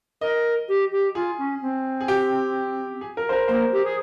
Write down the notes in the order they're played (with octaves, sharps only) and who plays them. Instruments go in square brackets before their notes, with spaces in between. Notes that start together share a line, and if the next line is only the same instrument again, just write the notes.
[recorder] A#4 [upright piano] D#5
[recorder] G4
G4
[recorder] F4 [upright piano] G#4
[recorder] C#4
C4
[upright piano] G#4
G4
G#4
A#4
C5
A#4
[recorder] A#3 [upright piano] C5
[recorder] G4
G#4